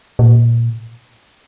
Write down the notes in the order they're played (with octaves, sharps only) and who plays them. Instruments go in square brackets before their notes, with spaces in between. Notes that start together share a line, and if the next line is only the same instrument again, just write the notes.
[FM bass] A#2